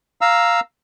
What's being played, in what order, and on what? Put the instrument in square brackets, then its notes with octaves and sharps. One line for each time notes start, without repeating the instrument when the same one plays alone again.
[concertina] F5 A#5 E6